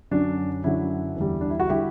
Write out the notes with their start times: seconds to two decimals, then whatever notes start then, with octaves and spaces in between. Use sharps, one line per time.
0.11 F#2 D3 F#3 D4
0.64 F#2 D3 F#3 E4
1.16 E2 D3 G3
1.41 D4
1.50 E4
1.60 F#4
1.70 D3 G3 E4 G4